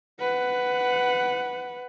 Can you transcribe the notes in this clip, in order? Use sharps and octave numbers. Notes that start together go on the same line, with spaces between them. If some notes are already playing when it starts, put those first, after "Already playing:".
B4 F#5